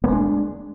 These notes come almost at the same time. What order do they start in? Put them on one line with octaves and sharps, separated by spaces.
A#3 G#3 D4